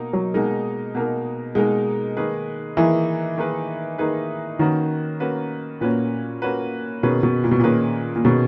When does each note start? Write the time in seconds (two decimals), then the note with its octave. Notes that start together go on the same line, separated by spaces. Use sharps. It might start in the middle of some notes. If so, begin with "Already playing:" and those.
Already playing: B2 A#3 D#4 A#4
0.13 F#3
0.34 B2 G#3 A#3 D#4 A#4
0.95 B2 A#3 D#4 A#4
1.55 B2 G#3 A#3 D#4 A#4
2.17 D#3 A#3 D#4 G#4 B4
2.77 D#3 E3 A#3 D#4 G#4 B4
3.38 D#3 A#3 D#4 G#4 B4
3.98 D#3 A#3 D#4 G#4 B4
4.59 D#3 A#3 C#4 F#4 B4
5.20 A#3 C#4 F#4 B4
5.81 A#2 A#3 C#4 F#4 B4
6.42 A#3 C#4 F#4 B4
7.03 B2 D#3 A#3 C#4 G#4 B4
7.23 B2
7.44 A#2
7.51 B2
7.59 A#2 D#3 A#3 C#4 G#4 B4
8.16 A#2
8.24 B2 D#3 A#3 C#4 G#4 B4